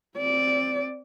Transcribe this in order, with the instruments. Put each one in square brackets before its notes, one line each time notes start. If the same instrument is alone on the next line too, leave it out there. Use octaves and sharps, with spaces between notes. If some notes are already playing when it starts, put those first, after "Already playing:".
[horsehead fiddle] C4 D5